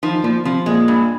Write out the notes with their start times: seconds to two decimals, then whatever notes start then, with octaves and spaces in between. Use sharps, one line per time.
0.03 D#3 F3
0.24 A#2 F3
0.45 C3 F3
0.66 A#2 G#3
0.88 G2